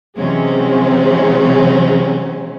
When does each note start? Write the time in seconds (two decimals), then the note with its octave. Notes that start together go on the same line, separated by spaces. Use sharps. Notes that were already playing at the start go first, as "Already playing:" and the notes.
0.16 C3 E3 F#3 G#3 C4 C#4